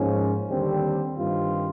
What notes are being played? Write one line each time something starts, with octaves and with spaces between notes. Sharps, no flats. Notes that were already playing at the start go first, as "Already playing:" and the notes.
Already playing: G#2 F3 A#3 C#4
D#2 D3 G3 C4
G2 D#3 G3 C4 F4